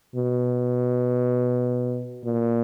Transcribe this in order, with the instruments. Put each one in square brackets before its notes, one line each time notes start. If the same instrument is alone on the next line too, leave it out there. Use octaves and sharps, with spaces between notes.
[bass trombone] B2
A#2